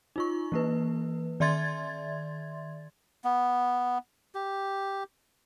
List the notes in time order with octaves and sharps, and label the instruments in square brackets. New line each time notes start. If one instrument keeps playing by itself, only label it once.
[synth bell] D#4 F4 C#6
E3 A#3 B4
D#3 D5 E5 C6 G#6 A6
[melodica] B3
G4